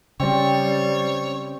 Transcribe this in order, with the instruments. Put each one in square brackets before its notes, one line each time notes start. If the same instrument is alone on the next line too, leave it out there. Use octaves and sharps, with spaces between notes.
[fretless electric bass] C#3 [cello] G3 [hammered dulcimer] C4 [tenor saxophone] C#5